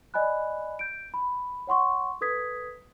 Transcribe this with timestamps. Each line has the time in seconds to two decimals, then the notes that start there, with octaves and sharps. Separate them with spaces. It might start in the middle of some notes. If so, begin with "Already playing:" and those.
0.14 D5 D#5 G#5 B5 F#6
0.79 G6 D7
1.14 B5
1.67 C#5 F#5 C6 C#6
2.21 A4 B4 D#6 G#6 B6